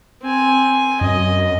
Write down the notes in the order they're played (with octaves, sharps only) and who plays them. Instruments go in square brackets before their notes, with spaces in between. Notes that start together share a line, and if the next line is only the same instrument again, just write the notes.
[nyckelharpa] C4 G#5
[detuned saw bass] F#2 [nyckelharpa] D#5